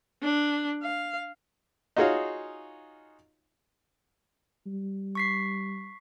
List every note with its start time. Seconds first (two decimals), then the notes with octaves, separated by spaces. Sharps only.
0.23 D4
0.83 F5
1.97 D#4 F4 F#4 G#4 C#5 F5
4.67 G3
5.15 C#6 B6 C7